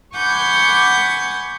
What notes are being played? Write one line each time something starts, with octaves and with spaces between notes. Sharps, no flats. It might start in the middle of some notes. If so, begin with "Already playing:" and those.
F#5 G#5 B5 C#6 D6 G6